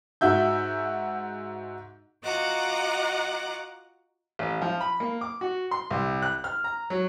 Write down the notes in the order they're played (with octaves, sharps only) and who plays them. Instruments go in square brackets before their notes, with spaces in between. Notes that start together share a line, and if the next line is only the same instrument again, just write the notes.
[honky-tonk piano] G#2 F#4 E5 G6
[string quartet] F4 F#4 D#5 F#5 A#5 D6
[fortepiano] A1
F3
B5
A#3
D6
F#4
C6
C2
F#6
F6
A#5
F#3